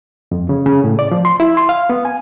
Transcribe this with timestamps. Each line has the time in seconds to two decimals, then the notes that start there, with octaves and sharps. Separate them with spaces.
0.32 F2
0.49 C#3
0.66 C#3
0.84 A2
0.99 D5
1.11 F3
1.25 C6
1.40 E4
1.57 C6
1.69 F5
1.90 B3
2.05 G#5